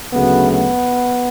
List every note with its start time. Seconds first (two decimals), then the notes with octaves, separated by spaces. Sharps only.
0.12 D2 C#3 F#3 A3 B3
0.52 B3